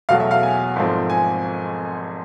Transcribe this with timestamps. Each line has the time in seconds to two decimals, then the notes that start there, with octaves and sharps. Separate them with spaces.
0.09 E2 B2 F#3 A3 F5
0.20 E5
0.31 F5
0.43 G#5
0.76 G#1 G#2 F3 A3 C4
1.10 G#5